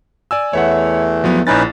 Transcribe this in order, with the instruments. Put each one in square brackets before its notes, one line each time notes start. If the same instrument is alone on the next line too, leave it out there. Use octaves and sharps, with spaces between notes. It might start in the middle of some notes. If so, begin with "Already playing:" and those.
[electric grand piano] D5 G#5 E6
[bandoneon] E2 E3 A3 [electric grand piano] C#5 E5 F#5
[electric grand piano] F3 F#3 B3
[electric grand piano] A#1 E4 A6 [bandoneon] C#4 D#4 B4